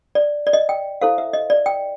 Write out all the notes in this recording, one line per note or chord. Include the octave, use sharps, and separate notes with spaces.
D5
D5
D#5
G5
E4 A4 C5 F5
E5
D#5
D5
G5